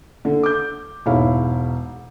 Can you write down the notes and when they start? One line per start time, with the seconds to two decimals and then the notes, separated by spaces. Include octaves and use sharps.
0.25 D3
0.43 D6 G6
1.06 E1 G#2 E4 C#5 F5